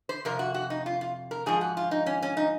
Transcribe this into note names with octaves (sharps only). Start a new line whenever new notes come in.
C5
F2 C3 A#4
F#4
F#4
D#4
F4
F4
A#4
G#2 F3 G#4
F#4
F4
D#4
C#4
C#4
D#4